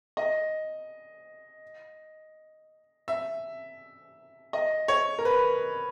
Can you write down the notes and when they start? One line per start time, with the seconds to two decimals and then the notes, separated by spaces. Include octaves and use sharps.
0.17 D#5
3.08 E5
4.53 D#5
4.88 C#5
5.19 A#4
5.25 B4